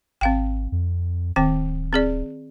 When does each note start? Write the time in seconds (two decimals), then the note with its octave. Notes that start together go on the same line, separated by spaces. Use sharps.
0.21 G#1 C4 F5 G5
0.72 F2
1.36 D1 D#3 C4 G5
1.93 C4 G#4 D5